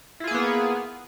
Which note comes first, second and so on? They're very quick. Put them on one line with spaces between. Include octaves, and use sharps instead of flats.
E4 F4 G#4 A#3 B3